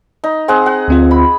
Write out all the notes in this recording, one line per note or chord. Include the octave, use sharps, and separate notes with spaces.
D#4
C4 G#4 F#5
F#5
D2 C4 F4
B5